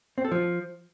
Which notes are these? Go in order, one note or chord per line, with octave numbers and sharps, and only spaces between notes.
C4
A4
F3